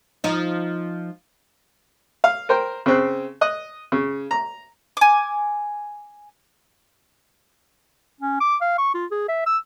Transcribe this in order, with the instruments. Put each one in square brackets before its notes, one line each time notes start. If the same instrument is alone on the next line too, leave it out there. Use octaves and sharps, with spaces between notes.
[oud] F3 D#4
[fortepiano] F5
A#4 C5 G5
C#3 C4 F#6
D#5 F#6
C#3
A#5
[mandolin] G#5 D6
[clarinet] C#4
D6
F5
C#6
F4
G#4
E5
E6